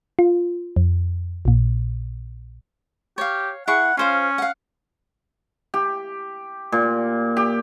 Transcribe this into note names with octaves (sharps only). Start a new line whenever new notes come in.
F4
F2
A#1 A#2
G4 C#5 F5
E4 G#4 F#5 C#6
C#4 F4 C5 F5
F5 F#5
G4
A#2
G4